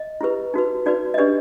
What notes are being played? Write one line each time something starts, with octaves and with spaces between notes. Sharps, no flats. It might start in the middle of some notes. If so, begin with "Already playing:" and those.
Already playing: D#5
E4 G4 B4
D#4 F#4 B4
D#4 F#4 B4 D5
D#5
D4 G4 B4 D5